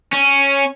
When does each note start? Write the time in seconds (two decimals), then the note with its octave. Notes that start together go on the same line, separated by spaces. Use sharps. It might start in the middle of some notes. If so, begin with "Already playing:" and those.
0.13 C#4